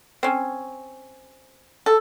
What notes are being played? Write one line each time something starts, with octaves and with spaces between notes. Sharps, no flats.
C4 C#4
A4